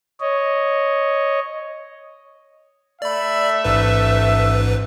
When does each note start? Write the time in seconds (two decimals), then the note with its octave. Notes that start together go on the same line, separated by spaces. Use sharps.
0.20 C#5 D#5
3.02 A3 D5 E5 B5
3.64 A1 G#2 B4